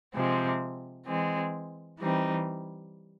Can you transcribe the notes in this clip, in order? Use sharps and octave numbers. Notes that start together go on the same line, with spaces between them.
C3 F3 G#3 C4
E3 G#3 C4
E3 G3 C4 D#4